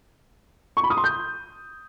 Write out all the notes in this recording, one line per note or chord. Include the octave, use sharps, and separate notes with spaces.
C#6
B5
D#6
C6
G6